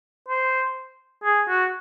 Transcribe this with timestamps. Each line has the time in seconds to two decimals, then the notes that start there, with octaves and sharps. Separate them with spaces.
0.28 C5
1.24 G#4
1.49 F#4